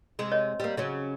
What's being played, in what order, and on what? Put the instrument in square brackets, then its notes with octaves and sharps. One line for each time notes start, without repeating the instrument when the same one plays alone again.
[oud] C3 G#3
[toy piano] C#5 D#5
[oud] G3 A#3
C#3 F#3 C#4